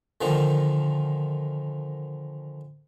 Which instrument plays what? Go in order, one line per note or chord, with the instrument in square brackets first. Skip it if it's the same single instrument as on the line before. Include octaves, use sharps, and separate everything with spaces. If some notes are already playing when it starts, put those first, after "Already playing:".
[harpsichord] A#2 D3 D#3 F3